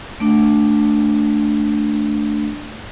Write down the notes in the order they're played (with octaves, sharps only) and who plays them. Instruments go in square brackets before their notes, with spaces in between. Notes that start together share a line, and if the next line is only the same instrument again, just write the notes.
[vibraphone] A3 D4